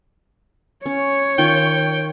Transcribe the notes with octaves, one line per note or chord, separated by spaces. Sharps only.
C#4 C#5
D#3 F4 G5 C#6